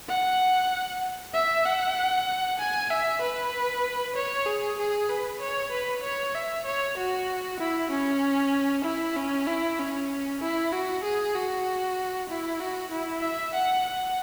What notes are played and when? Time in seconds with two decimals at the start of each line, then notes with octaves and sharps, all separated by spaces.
0.09 F#5
1.34 E5
1.66 F#5
2.59 G#5
2.90 E5
3.21 B4
4.16 C#5
4.47 G#4
4.78 G#4
5.09 B4
5.41 C#5
5.72 B4
6.03 C#5
6.35 E5
6.65 C#5
6.97 F#4
7.60 E4
7.91 C#4
8.85 E4
9.16 C#4
9.47 E4
9.79 C#4
10.41 E4
10.72 F#4
11.03 G#4
11.35 F#4
12.29 E4
12.60 F#4
12.91 E4
13.23 E5
13.54 F#5
13.86 F#5